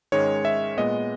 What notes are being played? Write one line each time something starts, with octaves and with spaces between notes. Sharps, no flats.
G#2 D#3 G#3 C#4 C#5
E5
A#2 G#3 B3 D#5